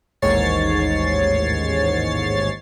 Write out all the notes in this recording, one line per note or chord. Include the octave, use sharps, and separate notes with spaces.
A1 D#2 G#2 C#5 A6 C7